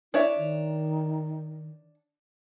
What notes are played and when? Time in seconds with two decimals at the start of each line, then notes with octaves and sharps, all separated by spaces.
0.14 D4 E4 C#5 E5
0.38 D#3